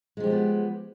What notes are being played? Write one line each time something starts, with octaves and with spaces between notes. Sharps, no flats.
F3 G#3 B3 D4 G4